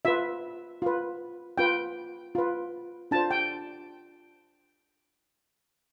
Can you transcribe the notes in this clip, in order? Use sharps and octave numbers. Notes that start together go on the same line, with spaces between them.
F4 B4 E5
F4 B4
F4 B4 G5
F4 B4
D4 F4 C5 A5
G5